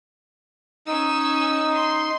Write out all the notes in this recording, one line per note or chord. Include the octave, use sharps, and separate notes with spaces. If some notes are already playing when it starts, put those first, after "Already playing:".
C#4 D#4 E6
C6